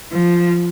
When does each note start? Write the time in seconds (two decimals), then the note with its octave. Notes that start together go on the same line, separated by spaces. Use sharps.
0.11 F3